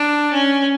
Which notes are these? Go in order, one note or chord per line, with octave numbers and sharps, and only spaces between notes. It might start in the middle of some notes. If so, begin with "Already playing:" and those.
Already playing: D4
C#4